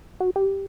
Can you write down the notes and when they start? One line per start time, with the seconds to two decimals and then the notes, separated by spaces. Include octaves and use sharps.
0.20 F#4
0.36 G4